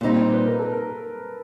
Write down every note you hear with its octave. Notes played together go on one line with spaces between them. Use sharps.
A#2 G3 C4 D#4
B4
A#4
A4
A#4